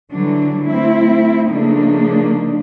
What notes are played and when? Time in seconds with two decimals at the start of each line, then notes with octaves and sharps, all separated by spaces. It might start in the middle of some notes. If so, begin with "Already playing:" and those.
0.11 D3 E3 F#3 G3 D4
0.67 A3 C4 E4
1.49 C#3 F3 A3 A#3 D4 D#4